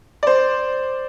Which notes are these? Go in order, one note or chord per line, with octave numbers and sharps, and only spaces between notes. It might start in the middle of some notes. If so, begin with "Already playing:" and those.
C5 D5